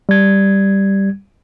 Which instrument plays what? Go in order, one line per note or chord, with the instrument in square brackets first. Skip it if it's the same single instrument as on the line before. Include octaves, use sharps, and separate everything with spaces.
[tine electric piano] G3 G#6